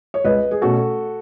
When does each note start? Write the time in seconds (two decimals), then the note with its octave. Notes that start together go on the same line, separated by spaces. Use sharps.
0.14 C#5
0.24 C#2 B4 D#5
0.51 G#4
0.62 B2 A3 C#4 F#4 A4